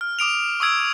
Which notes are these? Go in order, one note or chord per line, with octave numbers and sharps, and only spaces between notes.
F6
D6 D#6 D7 F7
C#6 D#6 E6 G#6 D7